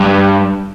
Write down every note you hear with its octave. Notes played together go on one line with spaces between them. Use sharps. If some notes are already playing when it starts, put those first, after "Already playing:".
Already playing: G2